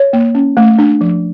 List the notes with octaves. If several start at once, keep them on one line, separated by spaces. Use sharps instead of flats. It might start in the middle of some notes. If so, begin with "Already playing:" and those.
Already playing: C#5
A#3
C#4
A3
D4
F3